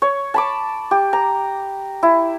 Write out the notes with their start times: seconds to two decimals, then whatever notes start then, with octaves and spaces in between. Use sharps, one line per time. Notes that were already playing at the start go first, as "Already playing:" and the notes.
0.02 C#5
0.34 A5 B5 D6
0.91 G4
1.13 A#5
2.03 E4